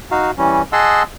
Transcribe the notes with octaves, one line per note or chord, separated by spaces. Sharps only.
D#4 F#4 F5
E3 G3 C#4
G#4 D#5 F#5 A5 C6 E6